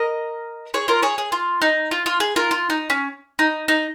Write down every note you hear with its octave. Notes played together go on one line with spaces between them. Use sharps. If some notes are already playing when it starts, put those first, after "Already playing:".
Already playing: A#4 D#5
G#4 C#5
F4 A#4
G#4 C#5
G#4
F4
D#4
F4
F4
G#4
F4 A#4
F4
D#4
C#4
D#4
D#4